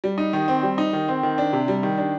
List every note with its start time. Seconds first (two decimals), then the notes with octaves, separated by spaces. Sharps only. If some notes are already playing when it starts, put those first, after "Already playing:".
0.04 G3
0.18 D#4
0.33 D#3
0.48 C4
0.63 G3
0.78 D#4
0.93 D#3
1.08 C4
1.23 D#3
1.38 D4
1.53 C3
1.68 G3
1.83 D#3
1.98 D4